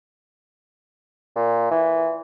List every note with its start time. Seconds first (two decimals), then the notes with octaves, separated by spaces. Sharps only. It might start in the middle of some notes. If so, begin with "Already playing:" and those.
1.36 A#2
1.71 E3